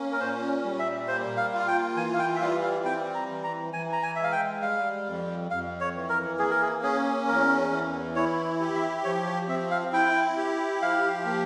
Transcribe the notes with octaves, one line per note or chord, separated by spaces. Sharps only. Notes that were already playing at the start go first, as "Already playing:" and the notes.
Already playing: A#3 C#4
A#4
A#2 C5
G3
E5
A#3 C5
F5
F4
F5
G5
E3 G#5
F5
G5
E5
G3 F5
F5
C4 G5
A#5
E3
A#5
E3 G#5
A#5
G#5
G#3 E5
F5
G5
G3 F5
F2
F2 F5
C#5
E3
A#4
A#3 G#4
A#4
G#4
C#4 G#4
E2 A#4
E3
E4 C#5
G4
E5
F3 C#5
C#5
C4 E5
F5
E4 G5
G4
F3 F5
A#3